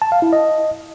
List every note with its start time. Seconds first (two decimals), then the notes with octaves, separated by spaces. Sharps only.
0.02 A5
0.12 F5
0.22 E4
0.33 D#5